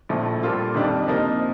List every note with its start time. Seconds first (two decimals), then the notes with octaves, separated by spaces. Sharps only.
0.09 A#1 A2 F3 A3
0.42 A#2 G3 A#3 F4 A4
0.74 F2 C3 D#3 G3 D4
1.07 C3 F3 A#3 D#4